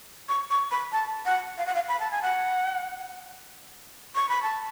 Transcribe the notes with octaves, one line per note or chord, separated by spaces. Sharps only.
C#6
C#6
B5
A5
F#5
F5
F#5
F5
B5
A5
G#5
F#5
C#6
B5
A5